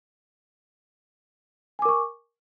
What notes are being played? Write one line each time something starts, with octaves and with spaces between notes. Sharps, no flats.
A#4 G#5 C#6 D6